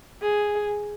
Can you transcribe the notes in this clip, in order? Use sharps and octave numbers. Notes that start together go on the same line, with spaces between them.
G#4